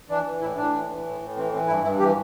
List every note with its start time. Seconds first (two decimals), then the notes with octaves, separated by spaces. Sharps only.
0.09 E3 D4
0.26 E3
0.41 A2 E4
0.57 A2 D4
0.73 E3
0.89 E3
1.05 A2
1.21 A2
1.36 E3 C4
1.53 E3 C4
1.68 G2 E4
1.83 G2 E4
1.99 E3 G4